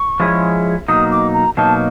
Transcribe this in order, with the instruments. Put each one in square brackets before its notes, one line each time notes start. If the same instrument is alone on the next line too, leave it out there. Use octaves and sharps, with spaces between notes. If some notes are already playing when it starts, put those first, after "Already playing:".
Already playing: [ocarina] C#6
[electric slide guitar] F3 G#3 C#4 E4 G#4
[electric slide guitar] B2 F#3 A#3 D#4 [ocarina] D#6
[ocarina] D6
A#5
[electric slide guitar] B2 F#3 A#3 D#4 [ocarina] A5